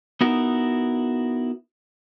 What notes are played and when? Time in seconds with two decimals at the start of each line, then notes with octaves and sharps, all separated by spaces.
0.21 B3 D#4 E4 F#4 A#4